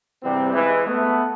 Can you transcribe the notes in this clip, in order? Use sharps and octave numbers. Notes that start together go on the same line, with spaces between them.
E2 G2 C3 G3 B3 C4
E3 G#3
A3 B3